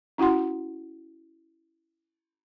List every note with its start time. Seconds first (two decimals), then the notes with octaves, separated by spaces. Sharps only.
0.18 C#4 E4 F#4 F#5 C6